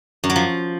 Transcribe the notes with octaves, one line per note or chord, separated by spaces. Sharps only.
F#2
F#3
F3